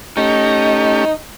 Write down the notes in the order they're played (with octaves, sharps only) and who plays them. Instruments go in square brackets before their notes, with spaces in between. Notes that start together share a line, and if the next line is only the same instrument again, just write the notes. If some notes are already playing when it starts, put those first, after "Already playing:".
[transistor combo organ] A3 C#4 G4 [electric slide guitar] D#4